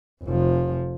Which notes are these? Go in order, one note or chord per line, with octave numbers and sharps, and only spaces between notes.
F1 F3